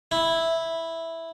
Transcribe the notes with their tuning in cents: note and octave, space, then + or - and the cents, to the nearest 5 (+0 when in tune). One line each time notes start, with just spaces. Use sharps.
E4 -5